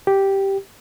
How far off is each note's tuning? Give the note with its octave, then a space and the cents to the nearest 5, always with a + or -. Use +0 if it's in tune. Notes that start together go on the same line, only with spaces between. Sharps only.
G4 -5